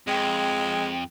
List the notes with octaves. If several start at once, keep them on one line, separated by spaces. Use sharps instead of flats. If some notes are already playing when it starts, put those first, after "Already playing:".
F2 G#3 G5